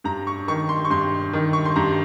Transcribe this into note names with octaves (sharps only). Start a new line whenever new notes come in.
G2 A#5
C#6
D#3 C#6
C6
C#6
G2 C6
D#3
C#6
C6
G2 A#5